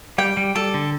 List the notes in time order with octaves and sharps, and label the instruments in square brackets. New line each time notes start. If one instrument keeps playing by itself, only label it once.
[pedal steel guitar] G3 [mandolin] G5
[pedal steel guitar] G3
[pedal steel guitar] G3 [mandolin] A4
[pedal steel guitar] D3